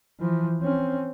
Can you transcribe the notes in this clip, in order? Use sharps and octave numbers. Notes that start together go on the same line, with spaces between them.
E3 F3
C4 C#4